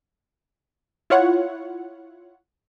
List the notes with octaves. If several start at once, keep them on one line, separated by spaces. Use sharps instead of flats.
E4 F4 C#5 F#5